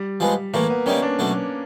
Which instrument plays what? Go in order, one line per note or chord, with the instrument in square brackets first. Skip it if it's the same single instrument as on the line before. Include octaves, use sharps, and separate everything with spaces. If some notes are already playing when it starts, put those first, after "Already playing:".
Already playing: [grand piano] G3
[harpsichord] F3 G#3 B3
[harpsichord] A2 E3 A3 [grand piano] A#3
[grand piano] B3
[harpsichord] D#3 G3 A#3 [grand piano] C#4
[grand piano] D4
[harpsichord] B2 F#3 A3